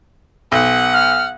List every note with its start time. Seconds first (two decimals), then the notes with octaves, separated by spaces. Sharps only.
0.52 B1 F#5
0.93 F6